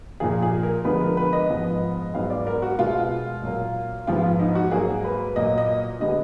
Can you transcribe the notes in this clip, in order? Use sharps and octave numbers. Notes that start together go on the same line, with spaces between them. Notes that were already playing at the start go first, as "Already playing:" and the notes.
A#2 F3 A#3 G#4
G#4
A#4
D3 F3 G#3 B3 B4
A#4
B4
D#5
G#2 F3 B3
G#2 F#3 B3 F5
D5
A#4
F#4
B2 G#3 B3 F4
A#2 F#3 A#3
G#2 F3 B3 F4
D#4
F#4
G#2 F#3 A#3 G#4
B4
A#2 F#3 A#3 D#5
D#5
D3 G#3 B3 D#5